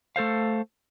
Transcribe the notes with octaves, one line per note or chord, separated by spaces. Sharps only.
A3 A4 C5 F5